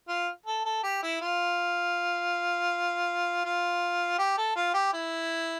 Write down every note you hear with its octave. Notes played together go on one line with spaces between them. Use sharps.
F4
A4
A4
G4
E4
F4
F4
G4
A4
F4
G4
E4